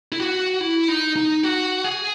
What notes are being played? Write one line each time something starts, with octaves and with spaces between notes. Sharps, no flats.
E4
F#4
E4
D#4
D#4
F#4
G#4